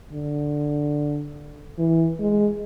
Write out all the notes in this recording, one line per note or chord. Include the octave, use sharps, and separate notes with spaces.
D3
E3
G#3